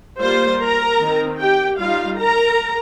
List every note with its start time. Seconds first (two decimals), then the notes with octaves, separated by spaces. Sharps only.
0.20 G3 A#3 F4 C5 C6
0.61 A#4 A#5
1.01 D#3 C4 D#4
1.41 G4 G5
1.80 G3 D#4 F4 F5
2.20 A#4 A#5